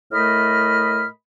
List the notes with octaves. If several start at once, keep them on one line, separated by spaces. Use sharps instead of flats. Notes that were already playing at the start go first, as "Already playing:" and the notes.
A2 A3 A#4 D#5 B5 F6